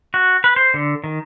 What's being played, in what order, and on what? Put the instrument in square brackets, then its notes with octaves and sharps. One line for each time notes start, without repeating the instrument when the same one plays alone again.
[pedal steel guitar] F#4
B4
C5
D3
D#3